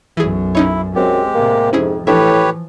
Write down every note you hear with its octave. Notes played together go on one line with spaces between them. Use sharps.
B1 F#2 E3 G#4
C#4 D#4 E4 C#5
F#2 G#3 C4 G4
A2 C3 A#3
F2 G#2 C#4 E4 G#4
A2 E3 F3 D4 G4 B4 C#5 E5